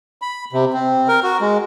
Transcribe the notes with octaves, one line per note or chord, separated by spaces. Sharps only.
B5
C3
C4
A#4
F#4
G#3